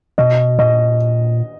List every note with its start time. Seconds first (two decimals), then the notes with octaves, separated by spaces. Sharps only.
0.18 B2 D#5
0.59 A#2 D#5